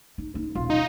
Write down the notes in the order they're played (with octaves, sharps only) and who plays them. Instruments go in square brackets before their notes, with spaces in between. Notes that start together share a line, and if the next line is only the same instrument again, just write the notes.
[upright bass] D#4
A#3 D#4
[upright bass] D#1 B1 [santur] F4
[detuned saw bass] D#4